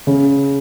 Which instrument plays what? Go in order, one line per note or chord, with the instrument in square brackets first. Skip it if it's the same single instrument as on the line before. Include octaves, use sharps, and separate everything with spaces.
[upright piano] C#3